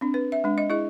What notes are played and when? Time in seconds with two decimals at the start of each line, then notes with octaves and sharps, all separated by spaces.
0.01 C4 D4
0.14 B4
0.32 E5
0.44 G#3 D4
0.58 D#5
0.70 E4 G#4 D#5